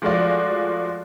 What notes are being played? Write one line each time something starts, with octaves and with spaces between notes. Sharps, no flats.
F3 G#3 A3 F4 F#4 D5